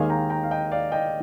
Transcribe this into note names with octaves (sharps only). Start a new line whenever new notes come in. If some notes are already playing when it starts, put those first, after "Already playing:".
Already playing: D#2 D#3 G#3 F5 G#5
G5 A#5
G5 A#5
F5
D#5 G5
D5 F5
D#5 G5